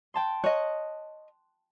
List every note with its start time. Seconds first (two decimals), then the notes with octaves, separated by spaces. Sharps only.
0.14 G5 A5 C6
0.44 C#5 D#5 F#6